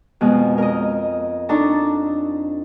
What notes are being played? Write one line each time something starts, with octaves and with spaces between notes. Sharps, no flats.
F2 B2 G#3
A#4 D#5
D4 D#4 A4 A5 A#5 C#6